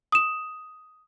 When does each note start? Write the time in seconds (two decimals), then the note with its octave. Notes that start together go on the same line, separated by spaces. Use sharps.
0.12 D#6 E7